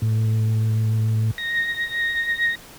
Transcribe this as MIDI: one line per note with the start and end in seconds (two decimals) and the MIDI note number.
0.02 1.31 45
1.38 2.55 94